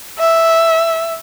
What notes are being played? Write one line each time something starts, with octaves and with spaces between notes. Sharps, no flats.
E5